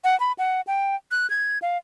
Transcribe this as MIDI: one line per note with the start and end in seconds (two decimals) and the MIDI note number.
0.04 0.18 78
0.20 0.32 83
0.38 0.61 78
0.67 0.96 79
1.11 1.29 90
1.30 1.59 92
1.62 1.78 77